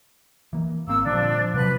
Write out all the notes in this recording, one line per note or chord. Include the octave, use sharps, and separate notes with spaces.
E3 A#3
G#1 A#3 C4 E6
A#2 D3 F3 G3 D4
C3 F3 F#3 C4 B4 F#6